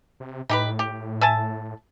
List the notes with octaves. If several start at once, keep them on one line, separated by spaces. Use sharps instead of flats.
C3
A2 D#4 G4 B4
G4
E5 G#5 A5